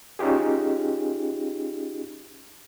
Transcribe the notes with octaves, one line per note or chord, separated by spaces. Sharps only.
C#4 D#4 F4 G4 G#4